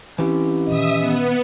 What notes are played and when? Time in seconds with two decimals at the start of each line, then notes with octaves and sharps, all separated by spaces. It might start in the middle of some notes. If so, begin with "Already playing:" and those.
0.18 E3 G3 C4 C#4 E4 G4
0.67 A#2 D#3 C#4 D#5 E5 D#6
0.97 B3